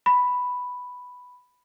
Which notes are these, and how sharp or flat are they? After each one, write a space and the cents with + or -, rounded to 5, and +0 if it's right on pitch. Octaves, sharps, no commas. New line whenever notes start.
B5 +5